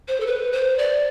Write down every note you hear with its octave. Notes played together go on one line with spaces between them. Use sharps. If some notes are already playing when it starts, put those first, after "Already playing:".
C5
A4
B4
C5
D5